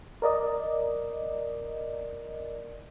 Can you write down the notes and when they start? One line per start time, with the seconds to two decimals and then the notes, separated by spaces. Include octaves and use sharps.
0.22 A#4 D5 D#5